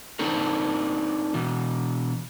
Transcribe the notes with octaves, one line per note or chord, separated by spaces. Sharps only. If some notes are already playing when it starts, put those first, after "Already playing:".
C4 D4 D#4 A#4 C#5
B2 E3